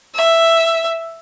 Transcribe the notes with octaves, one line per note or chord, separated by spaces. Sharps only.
E5